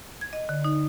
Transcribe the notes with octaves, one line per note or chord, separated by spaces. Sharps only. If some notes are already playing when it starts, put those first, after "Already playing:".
G#6
D#5
D3
D#4